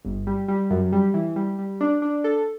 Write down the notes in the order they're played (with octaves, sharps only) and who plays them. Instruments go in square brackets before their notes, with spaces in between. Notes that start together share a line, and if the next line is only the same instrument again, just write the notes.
[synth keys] G1
G3
G3
F#2
G3
E3
G3
G3
D4
D4
A4